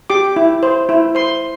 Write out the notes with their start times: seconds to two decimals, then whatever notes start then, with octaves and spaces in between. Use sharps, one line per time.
0.10 G4 D6
0.36 E4
0.63 C5
0.89 E4
1.15 C5 C6